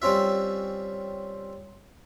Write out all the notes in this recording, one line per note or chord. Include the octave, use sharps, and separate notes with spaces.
G3 C4 C#4 F4 E5